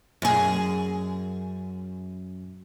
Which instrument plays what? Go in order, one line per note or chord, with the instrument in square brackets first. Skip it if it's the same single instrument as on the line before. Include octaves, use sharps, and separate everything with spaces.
[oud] F#2 G#4